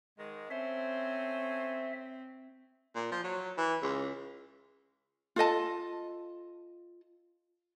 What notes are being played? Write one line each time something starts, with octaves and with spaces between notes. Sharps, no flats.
G#2 D#3 G#3
C4 C#4 A4 C5 E5
A#2
F3
F#3
E3
C#2
F4 A4 D#5 A5